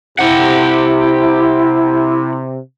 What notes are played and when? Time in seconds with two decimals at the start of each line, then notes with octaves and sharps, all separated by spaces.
0.19 C3 E4 G4 F#5